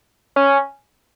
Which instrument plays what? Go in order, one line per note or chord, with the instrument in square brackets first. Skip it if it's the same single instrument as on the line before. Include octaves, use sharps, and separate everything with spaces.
[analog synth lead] C#4